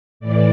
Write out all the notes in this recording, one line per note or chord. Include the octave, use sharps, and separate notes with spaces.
A2 E3 D5